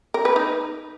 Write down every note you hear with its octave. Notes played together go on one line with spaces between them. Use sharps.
A#4
B4
D#4